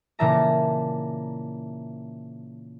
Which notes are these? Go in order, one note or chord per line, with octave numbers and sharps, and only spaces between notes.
A#2 C#3 E3 E5 A5 A#5